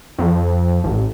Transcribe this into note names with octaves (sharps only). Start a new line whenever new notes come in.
F2
A1